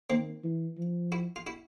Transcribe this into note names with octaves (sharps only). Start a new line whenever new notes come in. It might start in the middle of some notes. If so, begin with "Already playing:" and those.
D#3 A#3 C4
E3
F3
E4 F#4
F4
E4 F#4